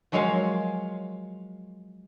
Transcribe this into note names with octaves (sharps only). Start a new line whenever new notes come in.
F3 F#3 G#3 A#4 C#5 F5